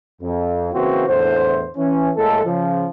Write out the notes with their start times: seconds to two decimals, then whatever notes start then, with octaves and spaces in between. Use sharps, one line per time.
0.22 F2
0.73 C#3 E3 A#3 C4 F#4 C5
1.08 E2 A2 D3 C5
1.77 E3 C#4
2.15 A2 G#3 A#3 A4
2.44 C#3 F3